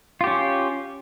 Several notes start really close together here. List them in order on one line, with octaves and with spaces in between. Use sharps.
F4 G4 C#4